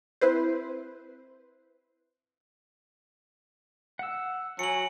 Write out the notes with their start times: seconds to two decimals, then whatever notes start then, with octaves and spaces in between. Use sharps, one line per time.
0.21 C4 E4 B4 C5
3.99 F#5 E6
4.59 F#3 G#5 C#7 F#7